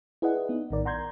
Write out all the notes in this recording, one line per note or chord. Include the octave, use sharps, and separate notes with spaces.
E4 G#4 B4 D5 D#5 F#5
B3 D#4
A#1 A2 D#3 A#4 D5
F#5 A#5 C6 G6 G#6